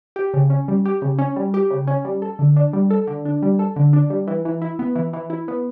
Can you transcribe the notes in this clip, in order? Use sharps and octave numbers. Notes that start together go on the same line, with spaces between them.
G4
C#3
C#4
G3
G4
C#3
C#4
G3
G4
C#3
C#4
G3
A4
D3
D4
G3
A4
D3
D4
G3
A4
D3
D4
G3
E3
E3
E4
B3
E3
E3
E4
B3